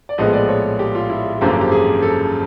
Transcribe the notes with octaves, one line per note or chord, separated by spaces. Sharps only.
D5
A#1 A2 F3 G#3 B3 D#5
D5
C#5
G4
F4
E4
G#1 F#2 D3 F3 A#3 G4
G4
G#4
A4